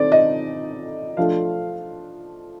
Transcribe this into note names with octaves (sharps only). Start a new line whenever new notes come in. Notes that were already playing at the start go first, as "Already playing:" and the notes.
Already playing: D#3 A3 C4 D#4 D5
D#5
F3 A3 D4 F4 F5